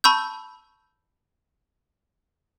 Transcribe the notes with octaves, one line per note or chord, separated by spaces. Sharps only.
A5 B5 C#6 E6 G6